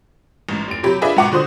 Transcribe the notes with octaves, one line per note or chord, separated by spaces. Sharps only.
A1 G#2
F1 D7
C3 F#3 G4 B5
D4 F4 G#4 B4 D#5 E5
G#2 B2 F#5 C#6 D6
D3 F#4 C5 C6 D#6